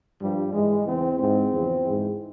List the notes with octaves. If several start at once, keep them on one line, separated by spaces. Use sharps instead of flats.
G2 F3 G3
G#2 E3 G#3
E2 C#3 E3 C4
G#2 E3 C4
E2 C#3 F3
G#2 E3